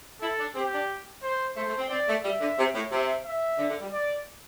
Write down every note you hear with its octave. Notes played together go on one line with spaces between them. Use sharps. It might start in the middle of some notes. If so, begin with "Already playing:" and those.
E4 A4
D4
C4 G4
D4
C5
A3 C5
A3
C4
C4 D5
A3
G3 E5
D3
C3
A2
C3 E5
E5
D3
D3
G3
D5